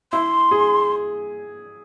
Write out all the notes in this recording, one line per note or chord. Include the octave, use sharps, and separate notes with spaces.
E4 C6
G#4